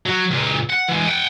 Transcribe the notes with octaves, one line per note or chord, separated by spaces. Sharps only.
F#3
C#2 A#2
F#5
E3 G#3
F#5 G5